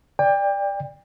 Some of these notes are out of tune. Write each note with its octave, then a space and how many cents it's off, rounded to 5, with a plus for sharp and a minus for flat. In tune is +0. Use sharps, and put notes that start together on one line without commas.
D5 +0 G5 +30